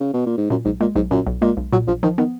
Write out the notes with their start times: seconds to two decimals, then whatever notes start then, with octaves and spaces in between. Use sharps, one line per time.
0.01 C#3
0.14 B2
0.26 A#2
0.37 G#2
0.50 F#2 A#2
0.65 B1 G#2
0.81 A#2 G#3
0.95 B1 G#2
1.11 F#2 A#2
1.27 B1
1.42 A#2 G#3
1.57 B1
1.73 A#2 F#3
1.88 A#1 F3
2.03 D#3 F3
2.18 D#3 B3